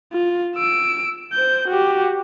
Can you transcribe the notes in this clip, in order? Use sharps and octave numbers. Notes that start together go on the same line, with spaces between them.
F4
E6 D7
C5 G6
F#4 G4